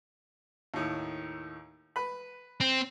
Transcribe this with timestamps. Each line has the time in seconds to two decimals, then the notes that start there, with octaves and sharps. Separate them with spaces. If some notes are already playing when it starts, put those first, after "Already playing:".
0.74 D#2 A2 D#3
1.96 B4 B5
2.60 C4